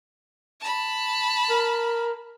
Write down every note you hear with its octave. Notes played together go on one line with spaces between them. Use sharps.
A5 B5
A#4